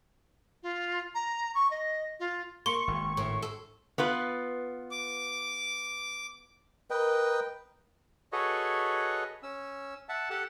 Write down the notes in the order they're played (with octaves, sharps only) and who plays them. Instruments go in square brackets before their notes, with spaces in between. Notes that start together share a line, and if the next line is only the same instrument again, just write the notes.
[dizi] F4
A#5
C#6
D#5
F4
[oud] A#3 [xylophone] C6 [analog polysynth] C#6
[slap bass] G#1
[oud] A2 C#3
A4
[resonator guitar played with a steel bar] B3 F4 B4
[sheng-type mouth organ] D6
[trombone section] A#4 [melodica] B4 D#5 G5
[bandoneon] F#4 G#4 A4 B4 C#5 D#5
C#4 E6
E5 F#5 A5
G4 A4 F#5 A5